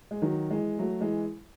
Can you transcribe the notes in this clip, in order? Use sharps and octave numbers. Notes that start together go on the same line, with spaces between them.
G#3
D#3 F#3
E3 G#3
F#3 A3
E3 G#3